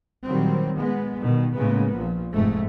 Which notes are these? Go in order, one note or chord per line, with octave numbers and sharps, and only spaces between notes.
A#2 D#3 F#3 G3 C4
G#3 B3
B2 D#3 G3
A2 C#3 G#3 A#3 B3
A#1 A#2 F3
F1 F2 G#2 A3